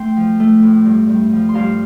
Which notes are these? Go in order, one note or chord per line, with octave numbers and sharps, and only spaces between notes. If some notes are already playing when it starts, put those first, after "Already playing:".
Already playing: A3 G5 C6
F3
A3
A2
G2
G2
F3
C6
G2 F5 A5